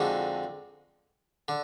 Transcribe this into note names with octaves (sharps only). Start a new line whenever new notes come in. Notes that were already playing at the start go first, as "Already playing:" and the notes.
Already playing: F2 D3 G#3 D#4 F#4
D3